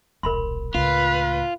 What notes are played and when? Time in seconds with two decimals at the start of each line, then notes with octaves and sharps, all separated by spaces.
0.23 D#1 B1 A#4 B5 C6
0.74 C#2 A2 F4 B4